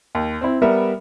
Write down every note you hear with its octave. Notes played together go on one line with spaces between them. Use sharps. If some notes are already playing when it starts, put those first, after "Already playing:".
D#2
C4 E4
G3 B3 A#4 E5